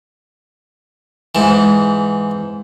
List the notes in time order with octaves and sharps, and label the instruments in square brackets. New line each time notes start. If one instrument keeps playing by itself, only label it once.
[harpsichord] G#2 E3